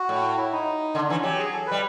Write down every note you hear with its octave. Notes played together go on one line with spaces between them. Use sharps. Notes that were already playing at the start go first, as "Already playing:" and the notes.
Already playing: F#4
A2
E4
D#4
D3 D4
E3 C#4
F#3 G4
G#4
A4
G3 B4